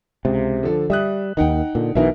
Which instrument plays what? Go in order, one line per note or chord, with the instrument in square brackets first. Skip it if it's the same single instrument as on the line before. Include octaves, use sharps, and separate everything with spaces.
[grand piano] C#2 [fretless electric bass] C3
[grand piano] D3 F3 A4
[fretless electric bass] G3 [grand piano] E5 D#6 F#6
[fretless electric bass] D#2 D#3 [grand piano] D#4 F#5 G5
[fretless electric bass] A#2 D3
[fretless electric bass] B1 B2 E3 [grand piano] D#4 A#4 E5